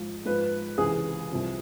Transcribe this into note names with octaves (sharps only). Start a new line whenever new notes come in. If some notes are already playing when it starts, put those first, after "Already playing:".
Already playing: G#2 F3
G#2 F3 B4
C#2 C3 E3 G#4
C2 C3 F3